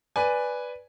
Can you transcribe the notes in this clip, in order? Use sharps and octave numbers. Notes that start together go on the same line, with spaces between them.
B4 D5 G#5